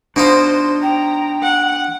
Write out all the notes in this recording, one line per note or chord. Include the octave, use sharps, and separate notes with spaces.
B2 D4 D#4 F4 C5
G5 A#5
F#5